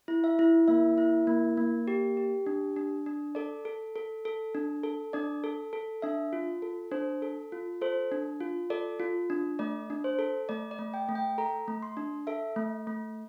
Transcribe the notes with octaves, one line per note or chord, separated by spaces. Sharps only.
E4
E5
E4
A#3 E5
E4
A#3
A#3
G4
G4
D4
D4
D4
A4 D5
A4
A4
A4
D4
A4
D4 D5
A4
A4
D4 E5
F4
A4
D4 C5
A4
F4
A4 C5
D4
F4
A4 D5
F4
D4
A3 D5
D4
C5
A4
A3 D5
D5
A3
G5
A3
G5
A4 A#5
A3
C6
D4
A4 E5
A3
A3